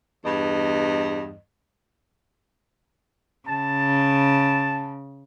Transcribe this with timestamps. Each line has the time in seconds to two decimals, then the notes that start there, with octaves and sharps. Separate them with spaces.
0.25 E2 G2 D#5
3.49 C#3 A5